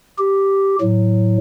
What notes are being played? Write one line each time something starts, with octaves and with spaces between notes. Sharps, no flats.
G4
A2 F#3